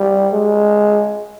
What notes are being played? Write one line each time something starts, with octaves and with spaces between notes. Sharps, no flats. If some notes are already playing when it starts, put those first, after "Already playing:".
Already playing: G3
G#3